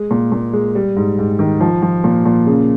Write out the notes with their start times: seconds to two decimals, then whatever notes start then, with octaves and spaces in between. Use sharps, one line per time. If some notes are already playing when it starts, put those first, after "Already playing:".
Already playing: G#3
0.11 A#2
0.32 A#2
0.53 G#3
0.75 G3
0.96 G#2
1.18 G#2
1.39 D#3
1.60 F3
1.82 F3
2.04 A#2
2.25 A#2
2.46 C#3